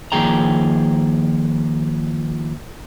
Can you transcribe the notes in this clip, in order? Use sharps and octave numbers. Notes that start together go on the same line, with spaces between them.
D#3 F3 A#3 G#4 G5 A#5